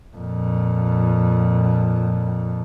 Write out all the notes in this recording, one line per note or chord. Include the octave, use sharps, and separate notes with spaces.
F2 A#2